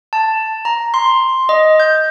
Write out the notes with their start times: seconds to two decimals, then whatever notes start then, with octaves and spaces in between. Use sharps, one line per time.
0.13 A5
0.65 A#5
0.94 C6
1.49 D#5
1.80 G6